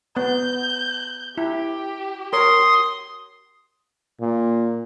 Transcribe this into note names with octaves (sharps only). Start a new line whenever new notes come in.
B3 G6
E4 G4
A#4 C#5 C6 D#6
A#2